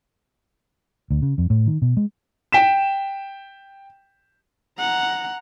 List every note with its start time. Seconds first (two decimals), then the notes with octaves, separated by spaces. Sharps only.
1.10 D2
1.22 C#3
1.38 F2
1.50 A2
1.66 D#3
1.82 B2
1.97 G#3
2.52 G5 B6 E7
4.78 F#5 A#5